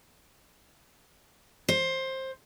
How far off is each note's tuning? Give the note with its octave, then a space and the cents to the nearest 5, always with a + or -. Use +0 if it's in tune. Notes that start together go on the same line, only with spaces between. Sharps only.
C5 +15